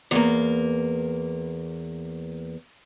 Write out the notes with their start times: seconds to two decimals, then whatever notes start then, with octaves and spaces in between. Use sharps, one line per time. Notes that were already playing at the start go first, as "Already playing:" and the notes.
0.11 E2 A#3